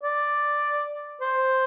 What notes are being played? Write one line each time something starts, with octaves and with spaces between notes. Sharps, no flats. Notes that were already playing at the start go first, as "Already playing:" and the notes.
D5
C5